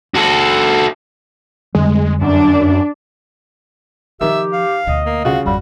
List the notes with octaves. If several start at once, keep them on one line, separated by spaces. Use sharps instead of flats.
F#4 A4
F2 D3 G3 G#3
F#2 D4
D#3 F3 G4 E5
F5
D2 B2 D#5
A#3
C#3 F4 F#4
G#1 F2 G3 F#4